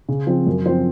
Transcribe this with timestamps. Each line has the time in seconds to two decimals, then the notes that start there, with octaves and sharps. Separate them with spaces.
0.08 C#3
0.27 F3 C4
0.46 F#2 A#4
0.66 F3 C4 C5